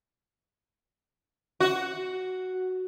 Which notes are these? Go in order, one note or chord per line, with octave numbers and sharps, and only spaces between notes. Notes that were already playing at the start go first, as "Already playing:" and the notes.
F#4